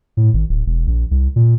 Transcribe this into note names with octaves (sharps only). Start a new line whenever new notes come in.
A2
G#1
D1
E1
A#1
C2
A#2